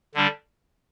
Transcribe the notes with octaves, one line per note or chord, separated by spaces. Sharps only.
D3 G3 D4